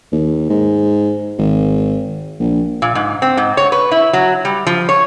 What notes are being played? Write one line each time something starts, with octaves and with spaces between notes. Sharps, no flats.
D#2
G#2
G#1
A#1
A#2
G#2
C4
G#2
C#5
B4
E4
F#3
G3
F3
C#5